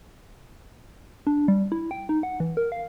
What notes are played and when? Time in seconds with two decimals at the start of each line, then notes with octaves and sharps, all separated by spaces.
1.27 D4
1.48 G3
1.72 E4
1.91 G5
2.09 D#4
2.23 F#5
2.40 E3
2.57 A#4
2.72 F5